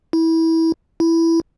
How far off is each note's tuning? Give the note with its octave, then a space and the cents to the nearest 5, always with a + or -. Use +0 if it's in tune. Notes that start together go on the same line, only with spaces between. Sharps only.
E4 -20
E4 +5